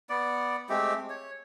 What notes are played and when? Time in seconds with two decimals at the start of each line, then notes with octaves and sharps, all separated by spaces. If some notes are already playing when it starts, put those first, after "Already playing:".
0.09 B3 D5
0.69 G#3 A3 C4 G4
1.10 C#5